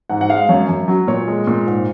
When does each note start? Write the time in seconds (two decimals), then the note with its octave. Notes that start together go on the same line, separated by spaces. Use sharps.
0.10 G#2 F#5
0.21 F#5
0.30 G#3 F5
0.49 F#2 C#5
0.69 F#2
0.88 F#3
1.07 A#2 C#5
1.28 G#3
1.47 A#2
1.67 G#2